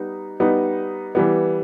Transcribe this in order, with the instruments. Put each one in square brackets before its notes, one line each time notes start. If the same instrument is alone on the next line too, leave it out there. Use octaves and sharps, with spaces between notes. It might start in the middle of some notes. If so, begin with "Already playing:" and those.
Already playing: [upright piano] G3 B3 D#4
G3 B3 D#4
E3 G3 B3